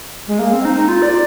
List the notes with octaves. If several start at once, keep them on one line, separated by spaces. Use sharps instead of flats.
G#3
A#3
C4
D#4
D#4
F4
D5